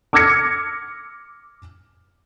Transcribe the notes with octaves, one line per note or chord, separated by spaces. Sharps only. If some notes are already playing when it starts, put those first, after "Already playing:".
D6 E6 F6 G#6 A#6 C#7